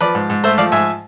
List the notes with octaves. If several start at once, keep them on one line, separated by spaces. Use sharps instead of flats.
F3 B4 D5
G#2
G#2
A3 C5 E5
F3 D5 F5
G#2 E5 G#5